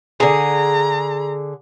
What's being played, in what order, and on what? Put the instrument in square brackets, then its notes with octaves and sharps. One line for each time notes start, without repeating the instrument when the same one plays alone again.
[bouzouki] D3 G#4 [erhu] A#5